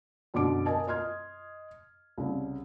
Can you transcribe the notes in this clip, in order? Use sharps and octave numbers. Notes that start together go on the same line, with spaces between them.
F#2 B2 D3 D6 D7
A#4 D#5 G#5 A5
D#5 C6 F6 G#6
C2 C#3